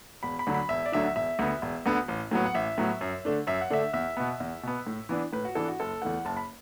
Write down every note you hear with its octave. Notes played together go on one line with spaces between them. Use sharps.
E1 B5
B5
D2 D3 F#3 D4
B5
E1 E5
D5
D2 D3 F#3 D4 E5
E1 E5
D2 D3 B3
E1
D2 D3 B3
A1
A2 F#3 B3
F#5
A1 E5
A2 F#3 B3
F#2
D3 A3 D4
F#2 E5
F#5
D3 A3 D4 E5
E2 E5
B2 B3
E2
B2 B3
A2
E3 B3 D4
A2 B4
F#4
E3 B3 D4 A4
F#4
F#1 A4
E2 E3 A3 F#5
F#1 A5
B5